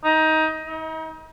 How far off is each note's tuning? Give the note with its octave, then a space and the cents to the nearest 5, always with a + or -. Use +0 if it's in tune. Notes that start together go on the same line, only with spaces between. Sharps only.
D#4 +20
D#4 +40